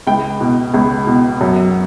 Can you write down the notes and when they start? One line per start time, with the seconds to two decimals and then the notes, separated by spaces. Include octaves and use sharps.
0.07 C#2 G5
0.41 B2
0.74 C#2
1.07 B2
1.41 F#2